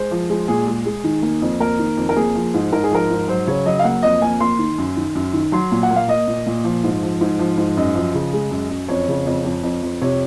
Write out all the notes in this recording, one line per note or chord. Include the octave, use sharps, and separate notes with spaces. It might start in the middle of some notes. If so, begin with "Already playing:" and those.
Already playing: G#3 C5
F3
G#3
A#2 G#4
G#3
G#3
D#3
A#3
F2
A#3 A#4
D#3
F2
A#4
A#3 G#4
F3
G#2
G#2 A#4
G#4
F3 A#4
G#2
F#3 C5
C#3 C#5
F#3 D#5
F5
A#3 F#5
F2 D#5
A#3 G#5
A#3 C6
D#3
F#2
D#3
F#2
D#3
F#3 C6
A#2
F#5
A#3
F5
A#3 D#5
A#2
A#2
F3
G#2
F3
G#2
F3
G#2
F#2 D#5
F3
C#3
G#3
F#2
F#2
F2 C#5
C#3
F2
F2
F2
F2
C3 C#5